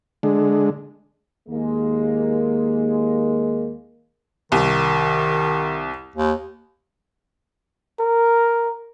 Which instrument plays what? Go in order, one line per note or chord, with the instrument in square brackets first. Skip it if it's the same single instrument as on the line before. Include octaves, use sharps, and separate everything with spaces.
[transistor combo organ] D3 G#3
[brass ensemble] D#2 G#3 A#3
[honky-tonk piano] C2 [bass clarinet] D#3
[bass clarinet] D#2
[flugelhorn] A#4